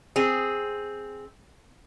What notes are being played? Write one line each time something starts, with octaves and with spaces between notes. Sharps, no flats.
C4 G#4